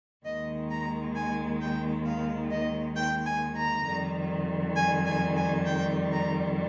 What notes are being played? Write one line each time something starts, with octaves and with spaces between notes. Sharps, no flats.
D#2 D#3 G#3 D#5
A#5
G#5
G5
F5
D#5
G5
G#5
A#5
F2 D#3 G3
G#5
G#5
G#5
G5
A#5